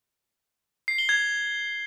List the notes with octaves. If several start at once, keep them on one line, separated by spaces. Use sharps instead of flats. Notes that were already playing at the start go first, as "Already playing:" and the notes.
C7
G7
G#6